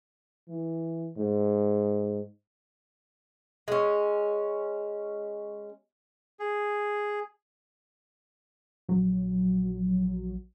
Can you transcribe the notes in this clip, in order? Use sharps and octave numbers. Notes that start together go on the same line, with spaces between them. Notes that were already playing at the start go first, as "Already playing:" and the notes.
E3
G#2
G#3 C#4
G#4
A#1 F#3